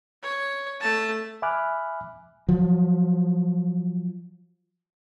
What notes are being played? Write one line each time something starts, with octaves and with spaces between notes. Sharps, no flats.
C#5
A3 A5
E5 G#5 B5 D6 F6 F#6
F3 F#3